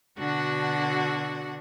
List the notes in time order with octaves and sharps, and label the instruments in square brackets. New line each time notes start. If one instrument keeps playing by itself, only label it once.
[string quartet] B2 D3 D4 F#4 F#5